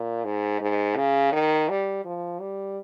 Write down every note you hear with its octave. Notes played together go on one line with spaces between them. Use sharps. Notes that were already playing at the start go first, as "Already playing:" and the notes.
Already playing: A#2
G#2
G#2
C#3
D#3
G3
F3
G3